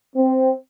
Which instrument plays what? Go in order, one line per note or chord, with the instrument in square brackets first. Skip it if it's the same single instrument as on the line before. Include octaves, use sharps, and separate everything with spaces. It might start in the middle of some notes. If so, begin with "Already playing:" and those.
[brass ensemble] C4